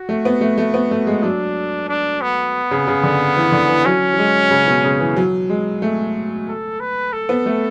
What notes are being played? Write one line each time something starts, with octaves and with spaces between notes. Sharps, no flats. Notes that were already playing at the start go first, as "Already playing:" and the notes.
Already playing: F#4
A3
B3
A3
A3
B3
A3
G#3
F#3 D4
D4
B3
C#3
C#3
D3
E3
D3
E3
F#3 C#4
F#3
G#3
C#3
B2
C#3
E3
F#3
G#3
A3
A4
B4
A4
B3
A3